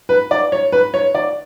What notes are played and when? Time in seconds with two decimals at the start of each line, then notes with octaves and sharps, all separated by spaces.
0.09 B4
0.31 D5
0.52 C#5
0.72 B4
0.94 C#5
1.15 D5